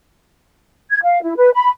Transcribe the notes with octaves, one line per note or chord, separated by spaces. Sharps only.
G#6
F5
E4
B4
B5